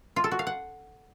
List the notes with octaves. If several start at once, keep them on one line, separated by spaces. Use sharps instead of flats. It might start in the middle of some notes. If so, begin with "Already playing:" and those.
F4
A4
F#4
F5
F#5